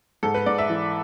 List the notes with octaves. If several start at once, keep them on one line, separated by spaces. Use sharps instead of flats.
G#2 A4
B4
G#2 D5
E5
E3